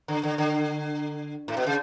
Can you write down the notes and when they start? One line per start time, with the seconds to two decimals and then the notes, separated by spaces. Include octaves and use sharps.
0.08 D3
0.23 D3
0.38 D3
1.48 A2
1.57 B2
1.66 C#3